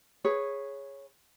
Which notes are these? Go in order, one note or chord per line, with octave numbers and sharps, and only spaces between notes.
G#4 B4 C#5